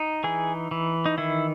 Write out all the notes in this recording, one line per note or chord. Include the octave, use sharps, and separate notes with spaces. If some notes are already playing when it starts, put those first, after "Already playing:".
Already playing: D#4
E3 G#4
E3
D#4
D#3 E4